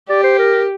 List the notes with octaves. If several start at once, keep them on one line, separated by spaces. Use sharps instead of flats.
G4 D5
C5
A#4